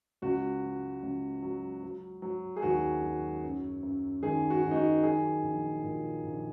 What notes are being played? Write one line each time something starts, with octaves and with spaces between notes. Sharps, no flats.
C#2 F#4
F#3
C#2
F#3
F#3
F#3
G#4
D#2 F#4
F#3
F#2
F#2
D#3 G#4
F#4
D#3
D#4
F#4
F#3 G#4
A#1
A#2
A#1